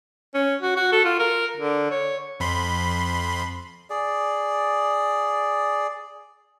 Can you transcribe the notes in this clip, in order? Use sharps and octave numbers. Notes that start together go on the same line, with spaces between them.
C#4
F#4
F#4
A4
F4
A#4
D3
C#5
F2 B5 C6
G#4 D5